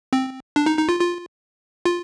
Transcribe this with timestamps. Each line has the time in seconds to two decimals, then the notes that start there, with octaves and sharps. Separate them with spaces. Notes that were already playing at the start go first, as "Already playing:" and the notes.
0.13 C4
0.56 D4
0.66 D#4
0.78 D#4
0.89 F4
1.00 F4
1.85 F4